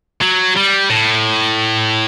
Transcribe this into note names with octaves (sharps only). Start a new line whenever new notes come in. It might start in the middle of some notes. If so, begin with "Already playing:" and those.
F#3
G3
A2